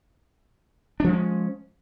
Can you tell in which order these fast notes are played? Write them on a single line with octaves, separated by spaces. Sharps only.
D4 F3 G#3 C#4